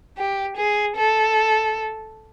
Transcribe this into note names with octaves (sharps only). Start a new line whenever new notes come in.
G4
G#4
A4